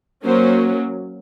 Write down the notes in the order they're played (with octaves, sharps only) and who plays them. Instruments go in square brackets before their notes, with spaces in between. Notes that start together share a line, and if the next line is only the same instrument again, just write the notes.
[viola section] F#3 A#3 C#4 C5